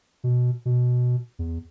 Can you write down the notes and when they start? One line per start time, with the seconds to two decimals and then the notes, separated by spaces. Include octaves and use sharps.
0.24 B2
0.65 B2
1.39 E2